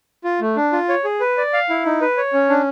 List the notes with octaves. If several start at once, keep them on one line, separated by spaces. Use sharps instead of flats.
F4
A3
D4
F4
C#5
G#4
B4
D5
F5
E4
D#4
B4
C#5
C#4
D4